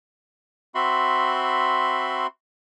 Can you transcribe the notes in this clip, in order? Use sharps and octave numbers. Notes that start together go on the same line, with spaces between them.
C4 F#4 E5 B5 C6